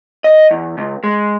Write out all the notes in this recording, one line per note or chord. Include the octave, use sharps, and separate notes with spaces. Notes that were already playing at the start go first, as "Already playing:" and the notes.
D#5
E2
C#2
G#3